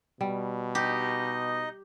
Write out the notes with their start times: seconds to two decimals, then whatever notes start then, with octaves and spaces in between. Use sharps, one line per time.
0.21 B2 G3
0.75 D#4 G4 D#5